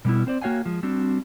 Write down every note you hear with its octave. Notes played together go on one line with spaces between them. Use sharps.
B2 G3 A#3 B3 E4
C4 C5 D5
A#3 F#4 C#5 F5 G5 G#5
F3 G#3
G3 C4 D4 F#4